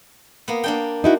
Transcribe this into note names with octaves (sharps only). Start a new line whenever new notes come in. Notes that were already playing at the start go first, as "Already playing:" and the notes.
A#3 B3
A#3 D4 G5
D#4 E4 F#4